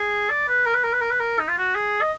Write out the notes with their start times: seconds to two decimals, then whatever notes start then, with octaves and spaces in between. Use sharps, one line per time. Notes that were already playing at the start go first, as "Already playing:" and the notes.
Already playing: G#4
0.30 D5
0.48 B4
0.66 A#4
0.74 B4
0.84 A#4
0.93 B4
1.01 A#4
1.11 B4
1.20 A#4
1.39 D#4
1.48 F4
1.58 F#4
1.75 G#4
2.01 D#5